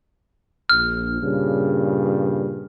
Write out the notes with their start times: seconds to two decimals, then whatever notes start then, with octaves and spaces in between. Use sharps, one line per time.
0.69 A#1 F6
1.21 G2 A#2 C#3